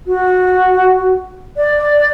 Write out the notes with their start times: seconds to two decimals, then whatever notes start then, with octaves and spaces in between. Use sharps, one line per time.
0.06 F#4
1.56 D5